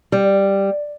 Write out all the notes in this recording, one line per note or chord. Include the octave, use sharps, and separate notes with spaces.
G3